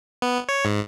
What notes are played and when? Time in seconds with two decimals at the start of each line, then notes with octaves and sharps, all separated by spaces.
0.22 B3
0.49 C#5
0.65 G#2